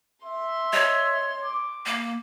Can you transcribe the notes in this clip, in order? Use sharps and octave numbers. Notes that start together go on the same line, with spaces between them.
E5 C6
C#5 D#5
D6
A#3